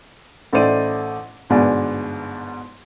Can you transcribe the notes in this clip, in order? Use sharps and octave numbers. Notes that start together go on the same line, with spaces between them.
A1 A3 D#4 C5 D5 D#7
G1 G#2 B2 D5 G#5